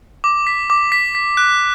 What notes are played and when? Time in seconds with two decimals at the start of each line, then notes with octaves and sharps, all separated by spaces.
0.24 D6
0.47 B6
0.70 D6
0.92 B6
1.15 B6
1.37 F#6